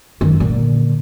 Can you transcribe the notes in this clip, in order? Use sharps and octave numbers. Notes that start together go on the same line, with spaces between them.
F#2 D#3
A#2 D3